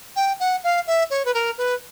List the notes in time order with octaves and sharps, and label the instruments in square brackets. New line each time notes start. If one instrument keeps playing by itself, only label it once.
[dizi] G5
F#5
F5
E5
C#5
B4
A#4
B4